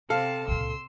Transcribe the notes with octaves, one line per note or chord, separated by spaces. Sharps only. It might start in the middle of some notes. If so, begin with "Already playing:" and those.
C3 C4 A4 F5 A5
C#2 A#2 C6 E6